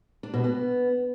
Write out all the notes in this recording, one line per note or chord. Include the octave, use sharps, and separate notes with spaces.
D4
B2
B3